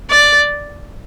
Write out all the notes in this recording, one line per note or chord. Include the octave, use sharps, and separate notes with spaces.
D5